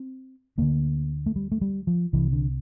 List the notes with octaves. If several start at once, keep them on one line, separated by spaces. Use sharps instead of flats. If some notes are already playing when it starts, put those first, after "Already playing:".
Already playing: C4
D2 D3 A#3
A3
G3
A3
G3
F3
C2 C3 E3
D3